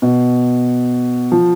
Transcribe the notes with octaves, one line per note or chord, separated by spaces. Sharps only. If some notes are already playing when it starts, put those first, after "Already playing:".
B2
F3